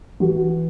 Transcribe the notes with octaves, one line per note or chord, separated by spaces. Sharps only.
E3 F#4